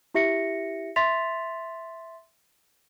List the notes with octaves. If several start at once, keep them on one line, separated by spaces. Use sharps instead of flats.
E4 G4 E5 A#6 C#7
E5 C6 A6 B6 F7